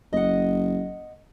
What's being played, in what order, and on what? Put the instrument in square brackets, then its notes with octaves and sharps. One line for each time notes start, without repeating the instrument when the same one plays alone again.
[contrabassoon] F#1 [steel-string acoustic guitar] D#5 F#5